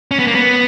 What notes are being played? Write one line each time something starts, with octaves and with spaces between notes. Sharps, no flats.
C#4
B3
A#3
B3